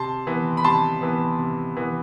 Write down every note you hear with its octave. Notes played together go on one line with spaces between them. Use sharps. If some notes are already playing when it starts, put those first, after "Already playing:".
Already playing: C3 A5 C6
E3 B3
B5
C3 A5 C6
E3 B3
C3
E3 B3